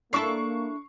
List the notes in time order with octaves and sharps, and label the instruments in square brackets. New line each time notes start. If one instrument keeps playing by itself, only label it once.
[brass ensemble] A#3 [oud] D4 E4 A4 [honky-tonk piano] C#6 C7